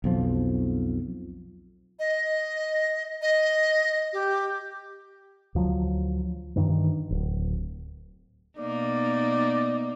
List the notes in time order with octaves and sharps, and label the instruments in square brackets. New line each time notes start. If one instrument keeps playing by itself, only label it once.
[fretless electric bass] B1 F2 F3
[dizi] D#5
D#5
G4
[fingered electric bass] D2 F3 F#3
G2 D#3 E3
D1
[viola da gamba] B2 A#3 D#4 [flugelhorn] D5